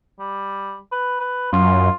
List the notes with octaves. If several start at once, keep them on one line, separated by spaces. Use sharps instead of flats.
G3
B4
B4
F#2 F4